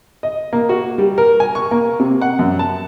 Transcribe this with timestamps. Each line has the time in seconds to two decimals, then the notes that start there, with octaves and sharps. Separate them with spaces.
0.23 D#5
0.53 A#3
0.69 F#4
0.98 G3
1.18 A#4
1.40 G#5
1.55 C#6
1.71 A#3
2.00 C3
2.21 F#5
2.39 F#2
2.59 A5